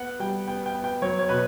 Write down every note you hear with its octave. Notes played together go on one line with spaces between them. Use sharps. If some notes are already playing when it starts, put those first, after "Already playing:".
Already playing: B3 F#5
G3 G5
B3 G5
G5
B3
G5
F#3 C#5
C#5
B2 B4